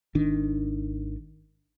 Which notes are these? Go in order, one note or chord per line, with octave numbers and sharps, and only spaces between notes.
G#1 D#3 D4